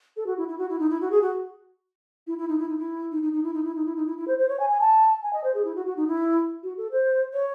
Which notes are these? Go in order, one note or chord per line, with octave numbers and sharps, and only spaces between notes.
A4
F#4
E4
E4
F#4
E4
D#4
E4
F#4
G#4
F#4
E4
E4
D#4
E4
D#4
E4
D#4
D#4
D#4
E4
D#4
E4
D#4
E4
D#4
E4
E4
C5
C5
C#5
G#5
G#5
A5
G#5
D#5
C5
G#4
E4
F#4
F#4
D#4
E4
F#4
A4
C5
C#5